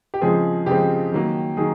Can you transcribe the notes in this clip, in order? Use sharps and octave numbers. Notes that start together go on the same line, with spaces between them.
G4
C#3 F3 G#3 C4 G#4
C#3 F3 G#3 C4 G4
D#3 F#3 A#3
D#3 F#3 G#4